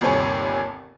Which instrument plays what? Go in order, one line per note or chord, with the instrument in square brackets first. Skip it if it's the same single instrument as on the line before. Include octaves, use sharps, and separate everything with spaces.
[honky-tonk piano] G1 D#2 C3 A4 C#5 G#5